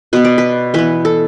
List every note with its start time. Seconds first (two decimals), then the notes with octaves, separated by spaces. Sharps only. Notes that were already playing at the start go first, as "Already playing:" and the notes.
0.13 B2 B3 B4
0.25 D5
0.38 B4
0.74 E3 B3 B4
1.05 A4